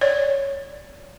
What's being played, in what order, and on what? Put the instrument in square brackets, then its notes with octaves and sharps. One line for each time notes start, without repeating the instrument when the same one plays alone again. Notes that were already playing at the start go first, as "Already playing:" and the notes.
[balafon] C#5 D5